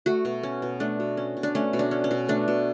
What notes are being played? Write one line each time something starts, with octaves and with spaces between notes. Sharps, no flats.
A3 F#4
B2
C#4
B2
A3 D4
B2
C#4
B2
D4
A3 C#4
B2
D4
C#4
C#4
B2
A3 D4
B2